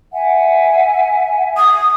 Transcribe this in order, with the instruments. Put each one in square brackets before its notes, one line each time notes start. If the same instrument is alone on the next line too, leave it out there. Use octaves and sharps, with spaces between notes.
[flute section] E5 F#5 G#5
[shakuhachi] D#6